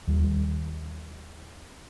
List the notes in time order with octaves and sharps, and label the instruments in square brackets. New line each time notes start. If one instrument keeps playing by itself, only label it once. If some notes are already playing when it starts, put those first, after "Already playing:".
[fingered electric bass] D#2 G3